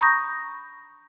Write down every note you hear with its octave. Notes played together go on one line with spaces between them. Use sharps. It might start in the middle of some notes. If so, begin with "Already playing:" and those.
A#5 B5 C#6 D#6 G6 A#6